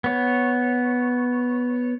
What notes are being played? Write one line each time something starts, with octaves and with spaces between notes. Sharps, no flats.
B3 C#5